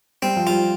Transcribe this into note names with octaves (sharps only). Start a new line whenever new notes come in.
G3 C4
F3
G3 F4